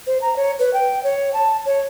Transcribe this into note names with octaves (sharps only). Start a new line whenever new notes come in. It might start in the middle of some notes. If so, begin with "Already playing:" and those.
C5
A#5
C#5
B4
G5
C#5
A5
C#5